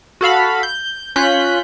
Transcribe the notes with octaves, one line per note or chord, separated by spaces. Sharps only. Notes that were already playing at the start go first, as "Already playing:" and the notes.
F#4 A4 F5 B5
G6
C#4 F4 F#6 G6 B6